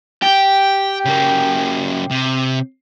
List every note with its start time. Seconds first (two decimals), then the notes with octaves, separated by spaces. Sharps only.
0.22 G4 G5
1.05 C#3 A#3
2.11 C3